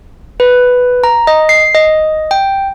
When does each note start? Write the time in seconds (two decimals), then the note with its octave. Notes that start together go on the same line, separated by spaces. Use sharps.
0.40 B4
1.04 A#5
1.27 D#5
1.49 C7
1.75 D#5
2.31 G5